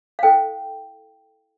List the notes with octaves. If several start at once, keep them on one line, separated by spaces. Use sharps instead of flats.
F5
E4 A4 C5 G5